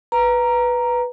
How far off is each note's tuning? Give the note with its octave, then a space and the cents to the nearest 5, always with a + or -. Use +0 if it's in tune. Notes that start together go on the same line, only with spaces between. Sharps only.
B4 +0 A#5 +0